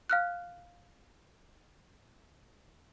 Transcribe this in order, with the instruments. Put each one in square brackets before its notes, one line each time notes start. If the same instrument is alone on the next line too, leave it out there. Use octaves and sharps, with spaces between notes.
[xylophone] F5 F6 F#6